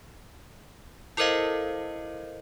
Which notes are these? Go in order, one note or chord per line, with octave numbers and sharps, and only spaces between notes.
E4 A4 A#4 C5 D#5 F5